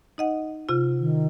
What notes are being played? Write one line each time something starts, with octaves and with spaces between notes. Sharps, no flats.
D#4 D#5 F#5
C3 F4
D#3